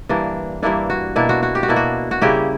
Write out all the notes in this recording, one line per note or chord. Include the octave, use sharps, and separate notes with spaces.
G2 E3 A#3 D4
G2 E3 A#3 D4 E4
F#4
B2 A#3 D4 E4
F#4
F#4
G4
F#4
B2 A#3 D4 E4
F#4
F#4
C#3 G3 A#3 C#4 E4 G4